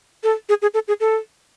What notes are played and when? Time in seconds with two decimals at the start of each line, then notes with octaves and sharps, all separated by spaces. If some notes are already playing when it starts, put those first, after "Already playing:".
0.23 A4
0.49 G#4
0.62 G#4
0.74 A4
0.88 G#4
1.00 A4